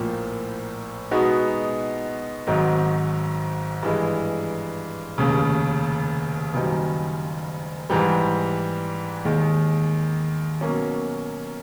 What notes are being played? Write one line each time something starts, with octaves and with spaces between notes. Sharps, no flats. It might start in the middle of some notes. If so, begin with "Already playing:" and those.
Already playing: A#1 A2 F3 A#3
B2 G#3 B3 D#4 F#4
G#1 G#2 D#3 F#3
G2 E3 G#3
F1 D#2 C#3
F#1 F#2 D#3 G3
G#2 E3 G3
D#2 D#3 G#3
B2 F#3 A#3 C#4